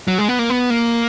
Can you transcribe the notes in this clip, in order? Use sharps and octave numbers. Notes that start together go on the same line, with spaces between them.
F#3
G#3
B3
A#3
B3
A#3